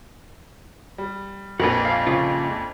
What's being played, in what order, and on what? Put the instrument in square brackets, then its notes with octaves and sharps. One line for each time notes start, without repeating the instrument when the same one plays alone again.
[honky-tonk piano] G3
[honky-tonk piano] A#1 F2 [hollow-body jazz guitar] F#4 A#4 B4
[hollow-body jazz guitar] F5
G#2 C#3 F4